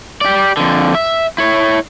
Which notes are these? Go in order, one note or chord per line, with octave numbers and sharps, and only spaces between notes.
G4 D5
F2 D3
E5
E4 C#5